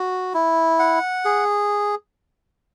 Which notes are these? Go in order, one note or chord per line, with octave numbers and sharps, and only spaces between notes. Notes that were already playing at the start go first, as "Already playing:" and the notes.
Already playing: F#4
E4
F#5
G#4